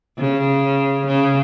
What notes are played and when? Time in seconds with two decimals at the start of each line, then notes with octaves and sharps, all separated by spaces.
0.18 C#3
1.06 C#3